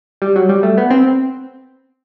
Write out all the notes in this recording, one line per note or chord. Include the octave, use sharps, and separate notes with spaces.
G3
F#3
G3
A3
B3
C4